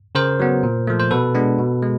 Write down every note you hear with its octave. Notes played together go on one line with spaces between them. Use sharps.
C#3 A#4 C5
F#3 B3
A#2
F3 A3
C5
B2 A4 B4
G#3 B3 D4
B2
G#3